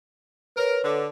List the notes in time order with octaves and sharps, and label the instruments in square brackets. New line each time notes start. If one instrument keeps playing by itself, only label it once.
[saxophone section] A#4 [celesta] B4 C#5
[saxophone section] D3